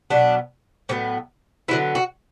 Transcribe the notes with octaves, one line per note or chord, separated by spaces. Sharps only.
B2 F#3 B3 D4
A2 F#3 B3 C#4
D3 F#3 B3 E4
F#4